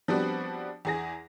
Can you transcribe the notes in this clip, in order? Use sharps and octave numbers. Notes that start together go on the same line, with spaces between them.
F3 G3 B3 C4 D4 F#4
E2 G#4 A#6